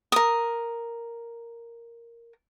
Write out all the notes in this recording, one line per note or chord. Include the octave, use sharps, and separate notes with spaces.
A#4 D#6